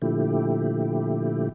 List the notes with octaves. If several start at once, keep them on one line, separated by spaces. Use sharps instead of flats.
A#2 D3 F3 A3 E4 G4